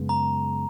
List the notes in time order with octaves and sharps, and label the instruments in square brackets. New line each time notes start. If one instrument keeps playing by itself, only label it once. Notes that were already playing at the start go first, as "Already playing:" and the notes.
Already playing: [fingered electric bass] F#2 C#3 G#3 B3
[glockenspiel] A#5